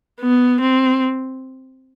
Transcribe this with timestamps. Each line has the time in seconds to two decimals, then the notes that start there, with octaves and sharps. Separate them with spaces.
0.21 B3
0.60 C4